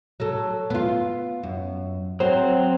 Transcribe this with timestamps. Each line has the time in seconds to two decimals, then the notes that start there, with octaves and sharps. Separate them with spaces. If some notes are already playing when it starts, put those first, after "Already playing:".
0.20 F#3 A4
0.70 B3 F4
1.43 F#2
2.20 F#3 C4 C5